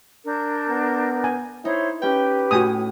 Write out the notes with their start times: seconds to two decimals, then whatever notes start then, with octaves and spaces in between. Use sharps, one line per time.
0.25 D4 A#4 G6
0.69 B3
1.24 G#5
1.65 D#4 E4 C5 C#5 C6
2.02 C#4 G4 B4 G5
2.51 A2 F#4 G#5 D#6